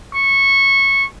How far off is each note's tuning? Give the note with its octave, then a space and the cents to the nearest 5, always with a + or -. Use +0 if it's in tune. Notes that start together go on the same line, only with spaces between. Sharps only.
C#6 -15